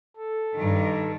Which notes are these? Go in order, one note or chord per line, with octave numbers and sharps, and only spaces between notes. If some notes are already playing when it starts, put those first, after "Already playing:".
A4
G2 D#3